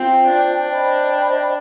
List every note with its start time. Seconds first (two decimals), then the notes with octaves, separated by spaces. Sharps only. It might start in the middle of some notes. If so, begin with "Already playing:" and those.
Already playing: C4 F4 C5 G5
0.28 D4
0.69 C5 D#5 G5 B5